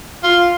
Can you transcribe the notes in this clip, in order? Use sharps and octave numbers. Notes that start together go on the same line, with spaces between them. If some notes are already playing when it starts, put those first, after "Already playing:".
F4